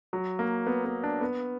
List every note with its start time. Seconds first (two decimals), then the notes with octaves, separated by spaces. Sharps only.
0.13 F#3
0.39 A#3
0.67 B3
0.85 B3
1.04 D4
1.21 B3